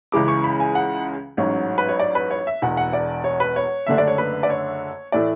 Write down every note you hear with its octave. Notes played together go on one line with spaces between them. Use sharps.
C#2 C#3 E3 G#3 D6
C#6
B5
G#5
F#5
A1 G#2 F#3 C#4
B4
C#5
D5
B4
C#5
E5
E1 E2 B2 F#5
F#5
D5
C#5
B4
C#5
F#1 F#2 D3 A3 D4 E5
D5
C#5
B4
D5
C#5
A2 E3 A3 D5